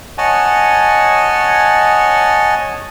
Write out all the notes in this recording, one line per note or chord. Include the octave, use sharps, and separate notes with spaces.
C#5 D#5 F#5 G#5 A5